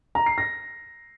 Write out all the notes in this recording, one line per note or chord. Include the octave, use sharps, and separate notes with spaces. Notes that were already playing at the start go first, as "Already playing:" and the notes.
A#5
C7
A#6